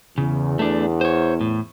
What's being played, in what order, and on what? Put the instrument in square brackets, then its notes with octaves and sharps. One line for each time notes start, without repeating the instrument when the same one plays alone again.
[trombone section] E2 [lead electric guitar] C#3
[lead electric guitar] A3 D4
C5 C#5
A2